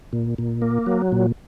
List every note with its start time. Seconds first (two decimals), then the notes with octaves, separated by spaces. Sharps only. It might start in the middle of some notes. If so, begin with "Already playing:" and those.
0.13 A#2
0.38 A#2
0.62 A#3
0.86 F#3
1.12 A#2